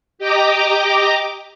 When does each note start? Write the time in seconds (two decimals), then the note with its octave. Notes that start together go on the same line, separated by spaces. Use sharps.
0.19 G4 D#5 G5 A#5 D6